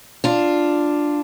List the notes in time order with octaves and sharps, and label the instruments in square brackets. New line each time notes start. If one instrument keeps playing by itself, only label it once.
[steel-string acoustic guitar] D4 F4